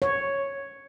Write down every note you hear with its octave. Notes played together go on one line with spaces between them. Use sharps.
C#5